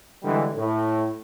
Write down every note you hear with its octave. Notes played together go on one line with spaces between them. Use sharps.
D3 E3 G3 G#3
A2